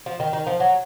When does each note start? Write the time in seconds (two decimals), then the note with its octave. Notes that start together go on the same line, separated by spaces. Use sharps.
0.06 F3
0.20 D#3
0.33 D#3
0.47 F3
0.60 F#3